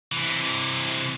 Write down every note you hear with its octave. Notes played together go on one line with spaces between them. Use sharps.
C3 E3